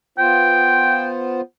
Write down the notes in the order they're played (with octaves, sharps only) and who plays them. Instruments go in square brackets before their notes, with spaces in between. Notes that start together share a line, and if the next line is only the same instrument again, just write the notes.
[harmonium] B3 F4 C5 [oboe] G5